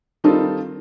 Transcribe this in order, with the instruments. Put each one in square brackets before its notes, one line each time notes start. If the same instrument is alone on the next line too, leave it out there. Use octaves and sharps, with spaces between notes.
[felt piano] D#3 G3 C4 D#4 F4 A4